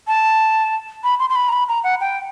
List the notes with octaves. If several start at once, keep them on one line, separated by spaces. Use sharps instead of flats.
A5
B5
C6
C6
B5
A#5
B5
A#5
F#5
G5